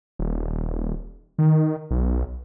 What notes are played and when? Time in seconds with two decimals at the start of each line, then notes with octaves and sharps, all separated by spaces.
0.19 D#1
1.38 D#3
1.91 B1